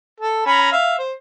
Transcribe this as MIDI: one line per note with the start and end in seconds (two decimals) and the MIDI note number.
0.20 0.45 69
0.46 0.71 61
0.46 0.71 82
0.46 0.71 83
0.72 0.96 76
0.72 0.96 77
0.98 1.13 72